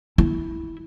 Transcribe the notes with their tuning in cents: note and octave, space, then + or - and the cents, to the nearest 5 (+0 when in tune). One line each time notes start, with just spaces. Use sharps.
E4 -10